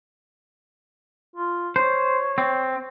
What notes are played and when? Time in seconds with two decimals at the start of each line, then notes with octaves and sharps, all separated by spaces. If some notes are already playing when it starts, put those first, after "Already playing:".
1.36 F4
1.76 C5 C#5
2.38 C4